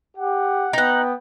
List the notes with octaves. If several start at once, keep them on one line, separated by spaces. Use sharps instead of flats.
G4 F#5
B3 D#4 F#5 G5